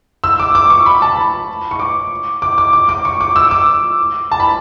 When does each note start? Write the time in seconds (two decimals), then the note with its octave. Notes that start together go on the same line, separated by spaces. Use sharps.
0.24 E6
0.39 D6
0.55 D6
0.70 C#6
0.86 B5
1.02 A5
1.17 B5
1.71 C#6
1.79 D6
2.42 D6
2.58 D6
2.73 D6
2.89 D6
3.05 C#6
3.21 D6
3.36 E6
3.51 D6
4.32 A5
4.40 B5